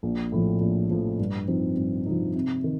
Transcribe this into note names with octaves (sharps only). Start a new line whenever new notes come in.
A#1
A2 F3
A#1
A2 F3
G2
F3 C4 D#4
G2
F3 C4 D#4
C3
D#3